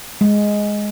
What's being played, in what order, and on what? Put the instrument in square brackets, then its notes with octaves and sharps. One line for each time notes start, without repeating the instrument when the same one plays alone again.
[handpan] G#3